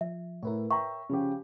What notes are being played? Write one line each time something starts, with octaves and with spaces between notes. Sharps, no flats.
F3 E5
A2 E4 A#4 B4 C#5
E5 G5 A#5 C#6
C#3 F3 C#4 G4